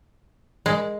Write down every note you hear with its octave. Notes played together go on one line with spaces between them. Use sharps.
G#3